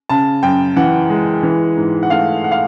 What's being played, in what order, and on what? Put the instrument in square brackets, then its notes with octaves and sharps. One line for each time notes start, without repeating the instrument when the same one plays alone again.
[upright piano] C#3 A5
F#2 G5
E3 F#5
G#3
E3
G#2
F#5
A3 F5
F#5
F5